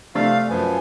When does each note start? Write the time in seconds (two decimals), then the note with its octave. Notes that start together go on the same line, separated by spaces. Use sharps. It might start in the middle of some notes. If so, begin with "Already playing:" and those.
0.15 C3 A3 D5 F5
0.48 F#2 F3 B3 G#5